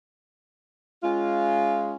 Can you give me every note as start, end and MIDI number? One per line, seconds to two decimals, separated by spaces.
1.03 1.95 56
1.03 1.95 61
1.03 1.95 65